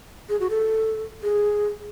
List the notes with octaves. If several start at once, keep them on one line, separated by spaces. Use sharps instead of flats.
G#4
F#4
A4
G#4